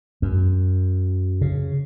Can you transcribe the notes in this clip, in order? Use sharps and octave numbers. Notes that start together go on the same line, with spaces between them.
F#2
C#3